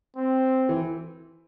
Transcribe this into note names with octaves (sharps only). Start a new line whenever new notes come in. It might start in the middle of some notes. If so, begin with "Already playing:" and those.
C4
E3